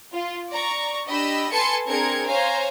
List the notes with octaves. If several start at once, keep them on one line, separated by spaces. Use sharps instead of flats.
F4
D5 A#5 C#6
D4 G4 D#5 B5 E6
A4 B4 G#5 A5 C6 C#7
C4 D4 G#4 A#4 G#6 C#7
C5 C#5 F5 G#5 A#5